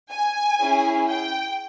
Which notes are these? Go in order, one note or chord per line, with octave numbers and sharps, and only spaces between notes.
G#5
C#4 E4 G#4
G5